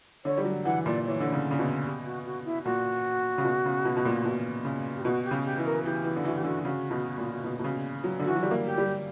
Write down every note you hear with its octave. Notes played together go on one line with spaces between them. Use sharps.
D3 C#5
G3
F#3
E3 F#5
A#2 D5
D5
E3 C#5
D3
C#3
C#3
B2
G4
F#4
F#4
E4
A#2 F#4
C#3
B2
C#3
B2
B2
A#2
B2
C#3
G4
B2 F#4
G4
C#3
G4
E3
A#4
E3 G4
E3
D3
E3 F#4
G4
D3 F#4
C#3 F#4
B2
A#2
B2
B2
C#3
F#3
D3
E3 F#4
F#3
G3
A#3
G4
G3